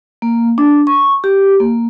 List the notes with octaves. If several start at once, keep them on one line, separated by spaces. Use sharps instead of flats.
A#3
D4
C#6
G4
A#3